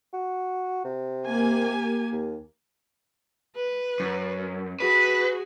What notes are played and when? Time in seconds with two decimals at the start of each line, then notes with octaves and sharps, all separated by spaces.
0.14 F#4
0.85 C3
1.25 A#3 G4 G#5
2.13 D#2
3.56 B4
4.00 F#2
4.80 F#4 G#4 B4